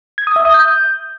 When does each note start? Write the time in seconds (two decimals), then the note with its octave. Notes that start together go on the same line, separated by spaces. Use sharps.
0.18 G#6
0.27 D#6
0.36 E5
0.45 D#6
0.54 G6